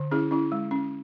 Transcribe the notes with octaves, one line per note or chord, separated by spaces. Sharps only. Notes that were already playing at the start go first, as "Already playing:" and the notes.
Already playing: D3
C#4 E4 G#4
C#4 E4
G#3
C#4